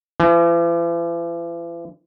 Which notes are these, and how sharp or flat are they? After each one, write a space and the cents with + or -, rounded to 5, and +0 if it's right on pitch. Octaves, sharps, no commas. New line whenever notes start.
E3 +45